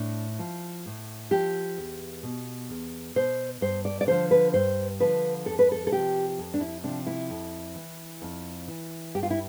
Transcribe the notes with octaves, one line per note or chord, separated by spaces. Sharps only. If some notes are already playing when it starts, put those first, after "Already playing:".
Already playing: A2 D4
F3
A2
F3 G4
E2
B2
E2
B2 C5
G2 C5
D5
D5
D3 F3 C5
B4
G2 C5
D3 F3 B4
F2 A4
B4
A4
A4
C3 F3 G4
F2
D4
E4
C3 F3 D4
E4
F2
E3
F2
E3
G2 G4
F4
E4